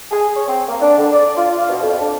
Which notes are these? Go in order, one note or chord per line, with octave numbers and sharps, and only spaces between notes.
G#4
C#5
C4
A#3
D4
D3
D5
F4
F5
B2
F2
D4